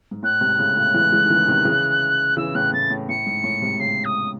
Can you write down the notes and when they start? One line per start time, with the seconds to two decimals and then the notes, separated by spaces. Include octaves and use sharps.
0.11 G#2
0.23 A2 F#6
0.41 G#2 C3
0.58 A2 C#3
0.77 A2 C#3
0.94 E3 G#3
1.12 E3 G#3
1.25 D#3
1.30 C#3 E3
1.48 C3 D#3
1.65 C#3 E3
2.37 C#3 E3 E6
2.55 A2 C#3 F#6
2.73 A2 A6
2.90 A2
3.09 A2 C#7
3.26 G#2
3.44 A2
3.62 G#2 C3
3.80 A2 C#3 C7
4.04 D#6